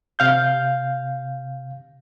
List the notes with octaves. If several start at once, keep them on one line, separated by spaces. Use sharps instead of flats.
C3 F5 G6